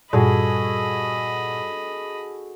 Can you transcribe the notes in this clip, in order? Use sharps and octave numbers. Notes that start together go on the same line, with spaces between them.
G2 A#2 F#4 G#4 A4 D#5 B5